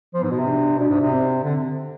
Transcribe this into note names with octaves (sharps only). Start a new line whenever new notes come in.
F3 B3
G#2
B2
C3
D4
B2 D4
G#2
C3
C4
D3